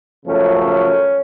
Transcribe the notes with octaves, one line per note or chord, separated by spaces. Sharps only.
F#2 C#3 F3 A3 C#4
C#4